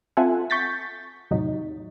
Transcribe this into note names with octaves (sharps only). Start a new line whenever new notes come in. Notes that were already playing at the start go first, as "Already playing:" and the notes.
C4 F4 A4 E5 F#5 G#5
C#6 G6 A6 B6
E2 A2 C3 F#3 D#4